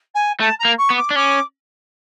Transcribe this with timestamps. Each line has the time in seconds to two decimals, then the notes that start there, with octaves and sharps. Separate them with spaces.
0.14 G#5
0.40 A3 A5
0.59 A#5
0.65 A#3
0.78 C#6
0.90 B3
0.97 D6
1.11 D4
1.15 C#4 D6